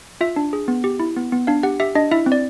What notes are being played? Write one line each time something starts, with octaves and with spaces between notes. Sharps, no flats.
F4 E5
D4
G#4
B3
G4
E4
B3
B3
D4 F5
G4 F#5
G4 E5
D4 D#5
E4 E5
C4
D5